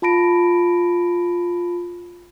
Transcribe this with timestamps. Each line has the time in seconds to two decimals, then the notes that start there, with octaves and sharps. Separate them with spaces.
0.02 F4 A5 B5 A#6 D7